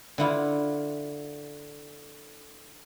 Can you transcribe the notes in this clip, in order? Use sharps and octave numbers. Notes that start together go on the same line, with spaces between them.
D3 E4 F4